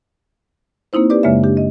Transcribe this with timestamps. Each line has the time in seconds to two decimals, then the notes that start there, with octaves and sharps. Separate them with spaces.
0.93 A#3 C4 D#4 E4 C5
1.10 G4 B4 D5 D6
1.23 F#2 C#3 G#3 A#3 C#5 E5
1.43 D4 G4
1.57 D#5